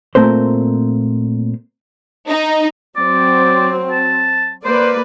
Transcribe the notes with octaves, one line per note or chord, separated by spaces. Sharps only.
A#2 D#3 A3 C4 A#4 C5
D#4
F#3 C4 D5
A5
A#3 B4 C5 D5